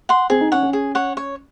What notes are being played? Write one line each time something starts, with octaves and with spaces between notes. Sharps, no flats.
F#5 C6
C4 G#4
D#4
C#4 C#5 F#5
C#4
G#4
C#5 F#5
C#5